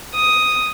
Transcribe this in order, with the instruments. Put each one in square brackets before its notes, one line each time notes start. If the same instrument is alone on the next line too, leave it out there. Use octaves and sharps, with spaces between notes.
[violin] D#6